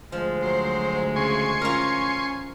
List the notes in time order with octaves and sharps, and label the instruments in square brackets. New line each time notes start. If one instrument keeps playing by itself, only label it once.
[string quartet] D2 G#3 [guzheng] F3
[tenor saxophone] F#3 [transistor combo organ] C5
[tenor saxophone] C#3 [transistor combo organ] G#5 C6 C#6
[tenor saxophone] C#4 [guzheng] F4 A#4